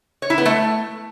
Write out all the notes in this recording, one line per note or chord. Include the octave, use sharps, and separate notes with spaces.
C#5
E4
B3
A3